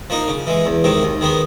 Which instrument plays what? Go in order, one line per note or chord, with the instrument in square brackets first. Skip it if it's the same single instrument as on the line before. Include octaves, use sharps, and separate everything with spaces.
[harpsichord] F3 A#3 D#4
C#3
E3 G#3
E2
C3 D#3 G#3
D#2
D#3 G#3 B3